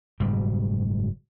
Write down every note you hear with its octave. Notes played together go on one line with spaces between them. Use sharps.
F#1 G#2 B2 G3